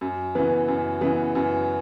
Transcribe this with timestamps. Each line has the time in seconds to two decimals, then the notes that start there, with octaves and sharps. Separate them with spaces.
0.01 F#2
0.35 C#3 E3 B3
0.68 F#2
1.01 C#3 E3 B3
1.35 F#2